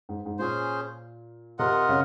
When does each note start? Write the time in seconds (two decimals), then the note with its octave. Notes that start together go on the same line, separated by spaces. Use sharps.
0.09 G#2
0.26 G#2
0.39 A#2 C#4 G#4 C5
1.59 C3 F4 A#4 D#5 F#5
1.89 C#3